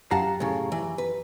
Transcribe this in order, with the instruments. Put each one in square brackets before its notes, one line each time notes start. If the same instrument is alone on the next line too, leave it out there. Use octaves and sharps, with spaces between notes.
[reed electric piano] F#2 G4 A#5 [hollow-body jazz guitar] F5 F#5 A5
[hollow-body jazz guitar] A2 C#3
E3
B4